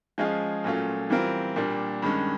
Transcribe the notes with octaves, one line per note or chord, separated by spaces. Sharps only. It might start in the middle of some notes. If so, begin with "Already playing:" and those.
F3 G#3 C#4 F4 G#4
A#2 F#3 A3 C#4 F4
E3 G3 C4 F4 A#4
A#2 G3 A#3 D4
G2 D#3 G#3 C#4